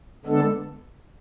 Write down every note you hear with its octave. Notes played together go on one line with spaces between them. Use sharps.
D3 G#3 B3 D4 A4